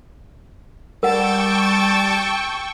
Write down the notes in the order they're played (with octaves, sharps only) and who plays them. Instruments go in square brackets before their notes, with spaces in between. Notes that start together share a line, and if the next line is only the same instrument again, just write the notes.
[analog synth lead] G3 [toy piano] A#4 F#5 [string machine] G5 C#6 [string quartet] A5 D6 E6